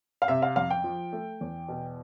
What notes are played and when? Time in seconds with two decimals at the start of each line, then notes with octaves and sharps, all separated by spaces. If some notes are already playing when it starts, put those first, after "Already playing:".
0.22 F5
0.28 C3 E5
0.42 F5
0.56 F2 F5
0.70 G5
0.84 F3
1.13 A3
1.41 E2
1.68 B2